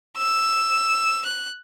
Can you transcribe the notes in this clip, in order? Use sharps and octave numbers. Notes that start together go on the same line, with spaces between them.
E6
F#6